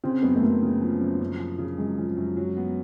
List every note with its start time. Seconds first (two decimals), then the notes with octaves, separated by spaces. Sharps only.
0.04 C#3 C4
0.23 F#2 B3
0.36 A3
0.42 F#2 A#3
0.62 C#3
0.81 F3
1.01 F#2
1.20 F#2
1.40 F3
1.59 C#3
1.78 F#2 G#3
1.98 F3
2.08 G#3
2.17 F#2
2.36 F#3
2.57 B3